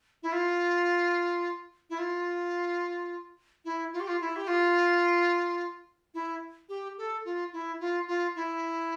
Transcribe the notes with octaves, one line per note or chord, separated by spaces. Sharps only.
E4
F4
E4
F4
E4
F4
G4
F4
E4
G4
F4
E4
G4
A4
F4
E4
F4
F4
E4